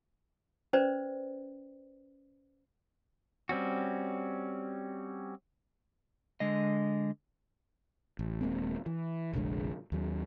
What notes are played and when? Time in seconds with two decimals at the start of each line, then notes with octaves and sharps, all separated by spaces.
0.73 C#4 B4 C5 D5
3.49 G3 C4 C#4 F#4
6.40 D3 G#3 D#5
8.19 A1
8.41 D#1 G#3 A#3 C4
8.86 E3
9.33 F1 A#1 D3 G#3
9.92 D#2 F#3